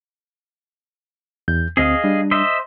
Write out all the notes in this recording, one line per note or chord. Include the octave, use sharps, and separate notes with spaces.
E2 G6
D2 C4 G#4 D#5 F5
G3 D4
C5 D#5 E5